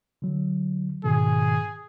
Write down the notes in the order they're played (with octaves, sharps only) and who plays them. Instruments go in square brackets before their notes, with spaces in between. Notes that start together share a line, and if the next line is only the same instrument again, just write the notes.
[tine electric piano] D3 F#3
[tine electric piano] G#2 B2 D#3 [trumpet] G#4